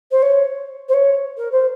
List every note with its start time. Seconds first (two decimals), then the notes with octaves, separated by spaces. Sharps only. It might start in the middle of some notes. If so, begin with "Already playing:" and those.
0.11 C5
0.22 C#5
0.88 C5
0.93 C#5
1.37 A#4
1.51 C5